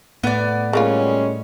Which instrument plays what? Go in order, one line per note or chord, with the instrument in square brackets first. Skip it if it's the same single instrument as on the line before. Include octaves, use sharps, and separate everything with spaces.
[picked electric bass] A2 [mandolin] B3 D5
[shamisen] C#3 A#3 F4 [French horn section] G3 G#3 C#4